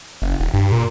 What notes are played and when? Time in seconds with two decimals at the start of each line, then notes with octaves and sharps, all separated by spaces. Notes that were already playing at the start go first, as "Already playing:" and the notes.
0.22 F#1
0.40 D#1
0.54 G2
0.72 A#2